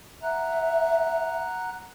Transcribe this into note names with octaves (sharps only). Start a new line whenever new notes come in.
E5 F#5 A#5 F#6